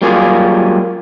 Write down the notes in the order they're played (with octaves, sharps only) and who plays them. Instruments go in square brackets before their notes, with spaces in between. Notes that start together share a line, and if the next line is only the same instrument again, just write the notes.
[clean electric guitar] F#3 G3 A#3 F4 G#4